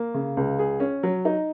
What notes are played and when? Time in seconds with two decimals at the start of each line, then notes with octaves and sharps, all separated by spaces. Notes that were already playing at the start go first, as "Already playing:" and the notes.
Already playing: A#3
0.14 C#3
0.37 C#2
0.59 G#4
0.80 C#4
1.03 F#3
1.25 D#4